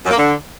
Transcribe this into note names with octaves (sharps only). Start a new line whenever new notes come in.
F#2
A#3
D3